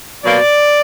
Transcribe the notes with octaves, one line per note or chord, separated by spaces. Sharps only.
B2 F#3 A#3 D5